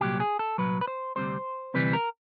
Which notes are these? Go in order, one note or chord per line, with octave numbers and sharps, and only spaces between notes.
C2 A#2 F#3 G4
G#4
A4
C2 A#2 F#3 B4
B4
C5
D2 C3 E3 G3 C4 C5
D2 C3 E3 G3 C4 B4
A#4